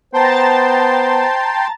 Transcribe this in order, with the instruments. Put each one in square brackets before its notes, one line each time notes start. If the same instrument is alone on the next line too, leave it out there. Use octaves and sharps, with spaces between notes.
[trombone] B3 [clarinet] C5 [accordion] G5 C6 [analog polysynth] A5 A#5 A6